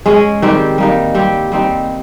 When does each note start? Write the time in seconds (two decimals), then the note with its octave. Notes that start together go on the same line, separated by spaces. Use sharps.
0.06 G#3 C#4 G#4
0.42 D#3 G3 C4 G4
0.78 G3 A#3 D#4
1.15 G3 C4 G4
1.52 G3 C4 D#4